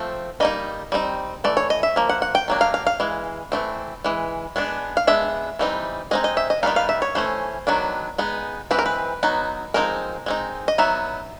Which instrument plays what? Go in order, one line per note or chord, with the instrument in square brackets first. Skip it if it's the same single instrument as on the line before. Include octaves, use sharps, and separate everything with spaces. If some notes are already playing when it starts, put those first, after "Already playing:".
Already playing: [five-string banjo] F3 A3 C4
G3 A#3 D#4 D#5
G3 C4 D#4
E3 A3 D5
C#5
D#5
E5
F3 A#3
F#5
F#5
G5
D#3 F#3 A#3 D4
F5
F5
F5
E3 G#3
E3 A3 C4
E3 G#3
G#3 B3 D4
F5
G#3 B3 D4 E5
E3 G3 C4 D#4
G#3 C4 D#4 D#5
D#5
E5
D#5
D#3 G3 B3 D#4 F5
F5
E5
C#5
E3 A3 C#4 C5
D#3 F#3 B3 D4
G#3 B3 D#4
E3 G#3 C4 B4
A#4
B4
F#3 B3 D#4
F3 G#3 C4 D#4 A#4
G#3 C4 D#4
D#5
F#3 B3 D#4 E5